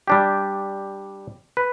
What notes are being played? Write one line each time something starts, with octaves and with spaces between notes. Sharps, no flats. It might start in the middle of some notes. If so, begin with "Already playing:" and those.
G3 D4 G4
B4